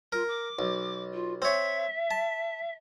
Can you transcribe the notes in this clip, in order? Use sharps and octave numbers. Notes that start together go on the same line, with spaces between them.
F4 A#4
D6
B1
F4
C4 C#5 E5
A5